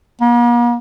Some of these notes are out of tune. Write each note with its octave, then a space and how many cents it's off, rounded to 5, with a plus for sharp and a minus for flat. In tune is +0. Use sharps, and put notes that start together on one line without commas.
A#3 +45